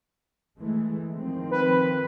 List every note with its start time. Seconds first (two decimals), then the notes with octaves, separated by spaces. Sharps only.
0.59 E3 G#3 A3
1.16 D#3 F3 C4
1.51 B4